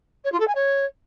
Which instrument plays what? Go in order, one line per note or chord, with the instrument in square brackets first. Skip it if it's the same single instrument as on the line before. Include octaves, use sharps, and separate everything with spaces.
[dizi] C#5
F4
A4
G#5
C#5